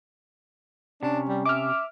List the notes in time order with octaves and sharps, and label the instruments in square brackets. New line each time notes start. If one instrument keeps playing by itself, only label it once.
[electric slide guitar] C3 [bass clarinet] C#4 [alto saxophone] D4
[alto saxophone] G3
[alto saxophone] E5 [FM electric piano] D6 F6